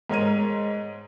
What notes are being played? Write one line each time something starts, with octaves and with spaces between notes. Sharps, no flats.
G#2 A#4 C#5 D#7